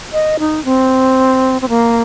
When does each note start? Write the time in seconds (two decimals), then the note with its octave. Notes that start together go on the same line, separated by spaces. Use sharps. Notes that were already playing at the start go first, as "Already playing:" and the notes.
0.13 D#5
0.39 D#4
0.65 C4
1.62 C4
1.69 A#3